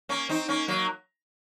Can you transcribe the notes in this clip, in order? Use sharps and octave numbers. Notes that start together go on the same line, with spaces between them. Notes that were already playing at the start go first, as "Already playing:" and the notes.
A#3 C#4
C4 D#4
A#3 C#4
F#3 A#3